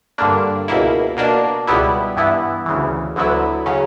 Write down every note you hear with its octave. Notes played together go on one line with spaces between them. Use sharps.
G2 D3 A#3 D4
C#2 B2 A#3 E4
B2 A#3 D4
C#2 B2 G3 B3 E4
G2 E3 B3 E4
D2 C#3 E3
D2 D3 F#3 B3 E4
C#3 F#3 C#4